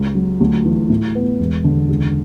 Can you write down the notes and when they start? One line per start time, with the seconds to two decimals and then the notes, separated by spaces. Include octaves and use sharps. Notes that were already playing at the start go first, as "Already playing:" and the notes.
Already playing: C#2
0.15 F#3
0.40 D2
0.65 E3
0.90 A2
1.15 B3
1.40 E1
1.64 D3
1.89 C#2